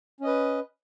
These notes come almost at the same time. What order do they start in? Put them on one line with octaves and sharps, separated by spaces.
C#4 D#5 B4